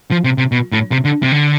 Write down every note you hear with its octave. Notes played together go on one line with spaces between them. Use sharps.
F3
C3
C3
B2
A2
C3
D3
C3
D3